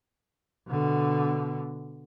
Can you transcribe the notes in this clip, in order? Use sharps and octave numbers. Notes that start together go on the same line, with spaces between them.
B2 D3